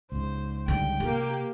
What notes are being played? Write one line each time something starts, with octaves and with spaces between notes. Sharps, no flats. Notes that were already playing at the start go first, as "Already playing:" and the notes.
C#2 G#2 C5
D3 G3 G5
C3 A#3 G4